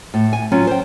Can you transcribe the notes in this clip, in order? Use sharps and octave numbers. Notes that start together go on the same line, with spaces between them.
A2
G#5
F#3 C#4 F4
C5 G5